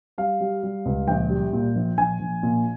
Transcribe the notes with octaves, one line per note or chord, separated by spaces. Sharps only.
G3 F5
G3
G3
C#2
A#1 G5
G3
A#2
A#1
A#1 G#5
A#1
A#2